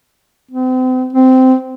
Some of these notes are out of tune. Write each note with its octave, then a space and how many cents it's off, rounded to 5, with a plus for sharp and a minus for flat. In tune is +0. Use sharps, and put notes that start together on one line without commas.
C4 -40
C4 -15